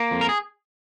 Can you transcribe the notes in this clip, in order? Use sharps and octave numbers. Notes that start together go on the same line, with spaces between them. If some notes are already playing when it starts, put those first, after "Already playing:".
Already playing: A#3
F2
A#4
G#4